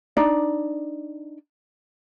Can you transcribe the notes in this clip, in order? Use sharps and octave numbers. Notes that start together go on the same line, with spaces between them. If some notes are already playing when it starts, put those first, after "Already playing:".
D4 D#4 D5